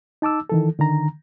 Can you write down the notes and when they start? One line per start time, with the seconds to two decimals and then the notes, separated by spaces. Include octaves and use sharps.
0.22 D#4 A5 D6 E6
0.49 D#3 E3 A4
0.79 D3 D#3 A#5